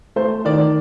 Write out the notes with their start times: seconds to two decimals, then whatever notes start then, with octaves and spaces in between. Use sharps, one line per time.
0.16 A3 C5
0.45 D#3 D5